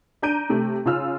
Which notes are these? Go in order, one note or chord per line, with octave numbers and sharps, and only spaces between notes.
D4 D5 A#5 G6 D7 D#7
C3 A3
C#3 F4 E6 F6